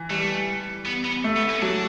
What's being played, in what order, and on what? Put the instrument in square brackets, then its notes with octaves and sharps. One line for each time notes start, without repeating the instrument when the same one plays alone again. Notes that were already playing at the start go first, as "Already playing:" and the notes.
Already playing: [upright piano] E3
[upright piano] G3 [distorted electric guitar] A3
[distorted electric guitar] B3
B3
[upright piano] A3
[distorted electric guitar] B3
C#4
[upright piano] F#3 [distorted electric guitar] D4